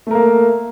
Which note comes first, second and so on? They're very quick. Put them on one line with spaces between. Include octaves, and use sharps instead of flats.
A3 A#4 A#3